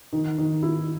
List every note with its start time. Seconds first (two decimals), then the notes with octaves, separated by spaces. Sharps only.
0.13 D#3
0.38 D#3
0.63 E4